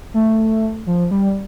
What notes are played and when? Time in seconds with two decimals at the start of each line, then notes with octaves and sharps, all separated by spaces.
0.14 A3
0.87 F3
1.11 G3